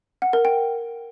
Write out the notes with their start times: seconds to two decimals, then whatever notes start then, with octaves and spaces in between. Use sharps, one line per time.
0.22 F#5
0.33 A#4
0.45 G5